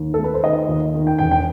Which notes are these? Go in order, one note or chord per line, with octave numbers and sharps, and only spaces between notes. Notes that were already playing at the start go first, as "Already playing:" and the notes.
Already playing: D#2
A3 A4
B4
C5
D#3 D#5
D#2
D#3
G5
E1 G5
G5